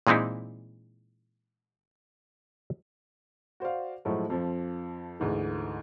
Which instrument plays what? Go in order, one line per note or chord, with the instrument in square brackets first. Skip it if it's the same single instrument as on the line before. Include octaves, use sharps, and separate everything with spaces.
[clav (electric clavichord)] A#2 E3 G#3 C4 D#4 E4
[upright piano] F#4 C5 D5 F5
A2 F3 F#3 G#3 A3
F2 F3
D2 G#2 E3